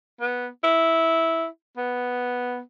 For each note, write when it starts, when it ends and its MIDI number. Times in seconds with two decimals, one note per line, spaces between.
0.21 0.48 59
0.64 1.45 64
1.77 2.60 59